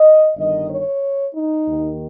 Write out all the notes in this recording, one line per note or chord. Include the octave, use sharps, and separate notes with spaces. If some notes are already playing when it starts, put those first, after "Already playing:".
Already playing: D#5
G1 G2 D#3 D#5
C#5
D#4
D#2 D#3